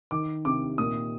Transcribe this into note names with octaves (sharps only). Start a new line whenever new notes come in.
D#3 D6
C3 D6
A#2 D#6